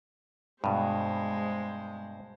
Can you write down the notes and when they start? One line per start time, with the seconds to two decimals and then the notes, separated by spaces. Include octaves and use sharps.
0.64 G2 B2 G#3 C5